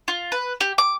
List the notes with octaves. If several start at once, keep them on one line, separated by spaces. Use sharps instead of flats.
F4
B4
G4
D6